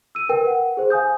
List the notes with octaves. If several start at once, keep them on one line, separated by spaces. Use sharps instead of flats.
E6 D#7
A#4 B4 G5
F#5
G#4 C5
F5 G#5 D#6 G6